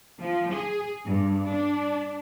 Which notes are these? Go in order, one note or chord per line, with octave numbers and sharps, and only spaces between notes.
F3
G#4
G2
D4